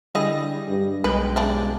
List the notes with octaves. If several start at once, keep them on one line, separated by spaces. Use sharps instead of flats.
D3 G3 E4 G#4 D#5 A#6
G2
B1 G2 G#3 B4 G5
C#3 D4 E4